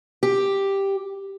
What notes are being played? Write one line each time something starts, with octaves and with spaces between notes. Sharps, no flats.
G4